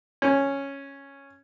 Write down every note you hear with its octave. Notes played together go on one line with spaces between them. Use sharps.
C#4